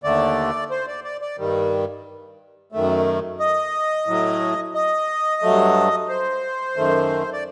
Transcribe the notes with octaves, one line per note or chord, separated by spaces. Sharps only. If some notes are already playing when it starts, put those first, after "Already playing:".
D#2 D3 A3 D5
C5
D5
D5
D5
G2 D#3 G3
F#2 D#3 A3
D#5
A2 F#3 A3
D#5
G2 F#3 A3
C5
F#2 D#3 A3
D5